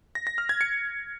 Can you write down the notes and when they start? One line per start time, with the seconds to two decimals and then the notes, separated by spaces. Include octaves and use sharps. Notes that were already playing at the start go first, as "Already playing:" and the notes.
0.15 A#6
0.27 A#6
0.38 F6
0.49 G#6
0.61 C#7